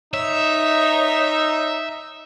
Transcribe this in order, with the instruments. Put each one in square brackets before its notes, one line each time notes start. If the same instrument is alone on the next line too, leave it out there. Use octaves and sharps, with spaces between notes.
[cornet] D#4 [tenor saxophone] C#5 [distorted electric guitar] E5